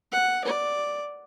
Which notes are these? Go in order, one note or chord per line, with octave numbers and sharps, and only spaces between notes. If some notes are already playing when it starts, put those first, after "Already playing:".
F#5
D5